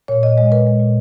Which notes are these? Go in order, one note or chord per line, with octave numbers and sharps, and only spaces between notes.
A#2 C#5
A#2 D#5
G#3 D#5
A#2 B4
G#3
A#2